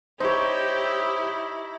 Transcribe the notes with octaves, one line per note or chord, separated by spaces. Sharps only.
D#4 E4 G4 C5 C#5